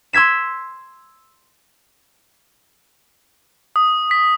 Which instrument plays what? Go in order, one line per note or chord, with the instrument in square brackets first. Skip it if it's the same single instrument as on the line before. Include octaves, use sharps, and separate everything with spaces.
[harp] C6 E6 G#6 B6 E7
[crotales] D#6
B6